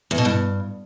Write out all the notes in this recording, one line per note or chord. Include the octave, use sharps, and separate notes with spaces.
E2
B2
G2